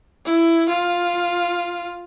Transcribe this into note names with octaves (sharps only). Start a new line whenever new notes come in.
E4
F4